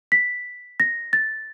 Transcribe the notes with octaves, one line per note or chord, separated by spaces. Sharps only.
B6
A#6
A6